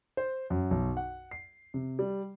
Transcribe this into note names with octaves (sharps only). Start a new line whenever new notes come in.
C5
F#2
B1
F#5
C7
C3
G3